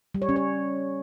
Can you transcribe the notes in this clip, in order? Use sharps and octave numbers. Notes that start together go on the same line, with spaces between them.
G3
C#5
C#4
C#5